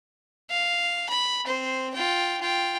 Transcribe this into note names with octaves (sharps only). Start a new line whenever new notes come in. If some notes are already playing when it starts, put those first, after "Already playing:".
F5
B5
C4 C5
F4 G5
F4 G5